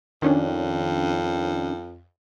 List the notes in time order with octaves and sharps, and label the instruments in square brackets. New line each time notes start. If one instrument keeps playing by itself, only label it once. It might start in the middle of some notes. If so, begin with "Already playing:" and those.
[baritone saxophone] F2 [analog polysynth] D#3 C#4 D4